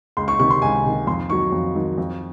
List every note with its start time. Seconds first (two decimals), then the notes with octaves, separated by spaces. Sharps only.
0.17 C#2 C6
0.28 C#6
0.39 C3 D#3 C#6
0.50 C6
0.62 C#2 G#5
0.85 C3 D#3
1.07 F2 C6
1.29 D#3 F#3 C#6
1.52 F2
1.75 D#3 F#3
1.98 F2